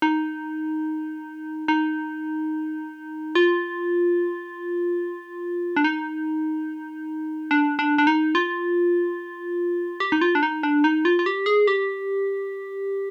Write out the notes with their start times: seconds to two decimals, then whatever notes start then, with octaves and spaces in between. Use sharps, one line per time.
0.02 D#4
1.68 D#4
3.35 F4
5.77 D4
5.84 D#4
7.51 D4
7.79 D4
7.98 D4
8.07 D#4
8.35 F4
10.00 G4
10.12 D#4
10.21 F4
10.35 D4
10.43 D#4
10.63 D4
10.84 D#4
11.05 F4
11.19 F4
11.26 G4
11.46 G#4
11.67 G4